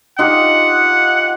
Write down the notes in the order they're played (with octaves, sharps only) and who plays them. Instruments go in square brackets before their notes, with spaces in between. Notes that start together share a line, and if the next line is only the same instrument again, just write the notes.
[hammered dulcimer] D#4 F4 G4 [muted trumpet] F#5